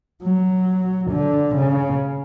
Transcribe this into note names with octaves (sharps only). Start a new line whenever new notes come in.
F#3
D3
C#3